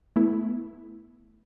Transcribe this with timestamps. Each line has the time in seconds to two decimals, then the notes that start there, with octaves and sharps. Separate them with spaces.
0.16 A3 B3 E4